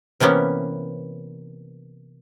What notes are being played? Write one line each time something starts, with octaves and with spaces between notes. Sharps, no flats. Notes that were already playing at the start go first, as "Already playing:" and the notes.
C3 E3 A#3 B3 C#4